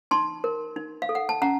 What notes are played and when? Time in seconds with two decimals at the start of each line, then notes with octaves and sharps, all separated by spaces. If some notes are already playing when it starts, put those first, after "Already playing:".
0.11 D#4 A5 C6
0.44 A#4
0.76 D#4
1.02 F5
1.09 A4
1.15 F#5
1.29 A5
1.41 C#4 F#5 A#5